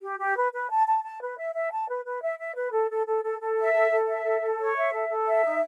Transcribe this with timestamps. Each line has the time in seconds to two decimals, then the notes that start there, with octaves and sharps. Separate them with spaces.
0.02 G4
0.20 G4
0.36 B4
0.53 B4
0.70 A5
0.86 A5
1.04 A5
1.21 B4
1.37 E5
1.54 E5
1.71 A5
1.89 B4
2.05 B4
2.22 E5
2.39 E5
2.56 B4
2.72 A4
2.90 A4
3.07 A4
3.24 A4
3.40 A4
3.58 E5
3.74 A4
3.91 A4
4.08 E5
4.25 A4
4.42 A4
4.59 C#5
4.76 E5
4.92 A4
5.09 A4
5.26 E5
5.44 D#4